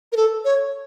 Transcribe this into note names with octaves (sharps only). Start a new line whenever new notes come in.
A#4
A4
C#5